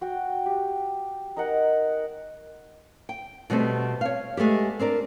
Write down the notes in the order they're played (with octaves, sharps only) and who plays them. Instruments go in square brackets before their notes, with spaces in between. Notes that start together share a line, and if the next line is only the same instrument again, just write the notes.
[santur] F#4 G5
G4
D#4 A#4 F#5
[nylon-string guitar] G5
B2 D3 G3 A3 B3 C4
C#5 F5
G#3 A3 B3 G4
C4 D4 A#4 D5